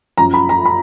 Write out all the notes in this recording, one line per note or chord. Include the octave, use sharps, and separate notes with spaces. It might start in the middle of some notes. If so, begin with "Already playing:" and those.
F#2 F3 A#5
B5
A#5
B5